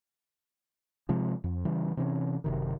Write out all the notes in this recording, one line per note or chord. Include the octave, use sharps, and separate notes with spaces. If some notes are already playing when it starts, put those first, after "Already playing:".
C3 F3 G#3
F2
C#3 E3 G3
C3 E3 C4 C#4
F#1 C3 D#3